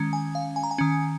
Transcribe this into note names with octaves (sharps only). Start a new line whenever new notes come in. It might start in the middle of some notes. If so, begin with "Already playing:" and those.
Already playing: D#3 G#3 C#4
G#5
F5
G#5
A#5
G#5
D#3 C#4